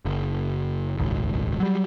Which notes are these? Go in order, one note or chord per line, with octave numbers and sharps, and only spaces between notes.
F#1
D#1 G#1 C#2
F#3 G3